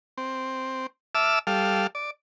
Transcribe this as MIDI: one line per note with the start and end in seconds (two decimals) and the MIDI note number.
0.18 0.87 60
1.15 1.39 76
1.15 1.39 81
1.15 1.39 86
1.15 1.39 88
1.15 1.39 89
1.47 1.87 55
1.47 1.87 69
1.47 1.87 77
1.95 2.11 74